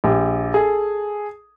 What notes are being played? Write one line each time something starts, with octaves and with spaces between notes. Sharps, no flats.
A#1 G4
G#4 A4